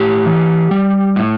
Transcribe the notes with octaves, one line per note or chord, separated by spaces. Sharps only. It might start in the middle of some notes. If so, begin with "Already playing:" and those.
Already playing: A2 G4
E3
G3
A2